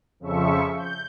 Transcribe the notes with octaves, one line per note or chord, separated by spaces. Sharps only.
F2 C#3 F3 E5 C#6
G6